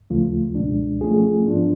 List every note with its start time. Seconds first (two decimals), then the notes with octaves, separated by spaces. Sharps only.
0.10 D2 C#3 F3 A3 F4
0.55 C#2 B2 G#3 D4
1.01 F3 A3 C#4 F4 G#4
1.45 G#2 F3 B3 D4 F4